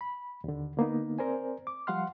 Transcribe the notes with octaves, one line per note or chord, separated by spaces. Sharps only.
B5
D#2 D3
D3 A#3 B3 D#4
C4 A#4 C5 D5 G#5
D6
F3 G3 F5 F#5 C6 F6